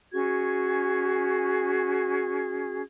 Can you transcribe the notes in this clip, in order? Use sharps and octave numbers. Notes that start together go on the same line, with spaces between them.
C#4 F#4 G#4 G#6